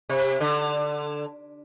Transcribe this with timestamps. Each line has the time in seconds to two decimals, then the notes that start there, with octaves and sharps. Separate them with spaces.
0.09 C3
0.40 D3